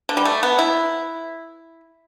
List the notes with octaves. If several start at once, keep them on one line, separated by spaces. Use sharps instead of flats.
D3
G3
A3
B3
E4